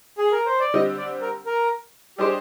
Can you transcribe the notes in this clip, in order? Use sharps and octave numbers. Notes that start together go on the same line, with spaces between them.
G#4
A#4
C5
D5
D3 G3 C4 G4 D#5
D5
A#4
A#4
G3 D4 G4 G#4 C5 D#5